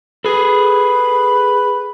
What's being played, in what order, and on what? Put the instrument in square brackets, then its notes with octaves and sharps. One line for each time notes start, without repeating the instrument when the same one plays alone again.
[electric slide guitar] G#4 A4 [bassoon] B4